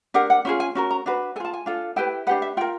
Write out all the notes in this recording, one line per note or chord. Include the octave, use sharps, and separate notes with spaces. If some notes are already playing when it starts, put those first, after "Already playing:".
D4 G4 A#4 F#5
F#5
C#4 F4 G#4
G#5
C#4 F#4 A#4
A#5
D4 F#4 B4
A4 G#5
F4 A5
G#5
D4 F4 A4
E4 G4 B4 G5
D4 G4 B4 F#5
E5
F4 A#4 G5